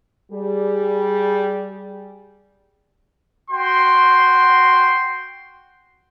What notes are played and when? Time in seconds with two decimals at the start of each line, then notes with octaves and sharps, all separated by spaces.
0.32 G3 G#4
3.50 F#4 G5 C6